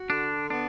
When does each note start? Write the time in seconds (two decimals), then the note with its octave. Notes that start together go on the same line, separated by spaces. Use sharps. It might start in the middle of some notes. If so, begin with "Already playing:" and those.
Already playing: F#4
0.09 D3 D4
0.50 B3 D4